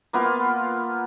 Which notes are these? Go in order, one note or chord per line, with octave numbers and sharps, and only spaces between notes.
A#3 B3 F4